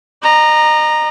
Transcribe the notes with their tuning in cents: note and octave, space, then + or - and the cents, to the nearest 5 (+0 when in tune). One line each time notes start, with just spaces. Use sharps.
D#5 -40 A#5 +0